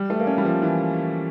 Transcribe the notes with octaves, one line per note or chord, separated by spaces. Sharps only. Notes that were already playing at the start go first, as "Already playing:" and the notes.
Already playing: G3
A3
A#3
C#4
G3
F3
E3